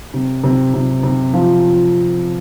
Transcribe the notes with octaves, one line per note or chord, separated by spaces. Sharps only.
C3
C3
C3
C3
F3